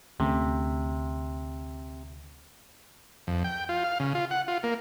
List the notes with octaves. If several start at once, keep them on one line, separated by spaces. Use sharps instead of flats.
D2 C3 A3 C#4
F2
G5
F4
F5
C#3
F4
F#5
F4
A#3